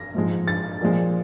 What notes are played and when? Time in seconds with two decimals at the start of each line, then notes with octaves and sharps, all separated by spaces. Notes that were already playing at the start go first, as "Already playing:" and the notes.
Already playing: A#6
0.14 G#2 F3 G#3
0.48 A6
0.81 A#2 F3 G#3